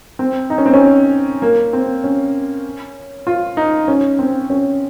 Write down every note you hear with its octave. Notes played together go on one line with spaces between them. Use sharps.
C4
D#4
C#4
C4
C#4
A#3
C4
C#4
F4
D#4
C#4
C4
C#4